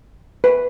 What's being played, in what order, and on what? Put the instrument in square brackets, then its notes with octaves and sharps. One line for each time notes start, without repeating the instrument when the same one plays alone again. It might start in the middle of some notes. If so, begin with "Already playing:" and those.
[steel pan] B4